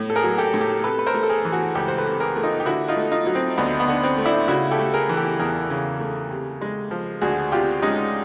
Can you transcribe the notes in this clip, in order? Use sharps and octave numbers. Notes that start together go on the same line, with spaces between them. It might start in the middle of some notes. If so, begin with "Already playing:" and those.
Already playing: A2 A3
A4
G#4 A#4
F#3
G4 A4
A2
G4 A4
C3 A4 B4
B4
A#4 C5
A3
A4
G#4 A#4
E3
F#4 G#4
C#2 G4 A4
C5
A4 B4
C3
G#4 A#4
A3
D#4 F4
G4
D3 E4 F#4
D#4 F4
A3
D#4 F4
F#3
C4
D2 B3
B3
D3
C4
A3
D4 E4
C#3 E4 F#4
G4 A4
A3
G#4 A#4
E3
G4 A4
E2 G#4 A#4
C#3
A3
C3
G#3
F3
D2 F#4 G#4
C3 F4 G4
G#3 C#4 D#4